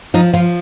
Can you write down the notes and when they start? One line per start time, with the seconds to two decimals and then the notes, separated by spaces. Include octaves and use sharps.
0.14 F3 D#4
0.34 F3 F4